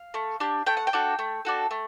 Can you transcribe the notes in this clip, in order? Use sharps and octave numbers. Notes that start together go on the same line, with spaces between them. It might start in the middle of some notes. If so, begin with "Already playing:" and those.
Already playing: F5
A3
D4 G4
A3 G5
F#5
G5
D4 F#4 A4
A3
D4 F#4 A4
A3